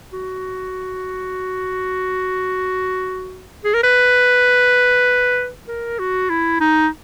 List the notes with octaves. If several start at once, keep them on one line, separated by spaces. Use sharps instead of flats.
F#4
G#4
A#4
B4
A#4
F#4
E4
D#4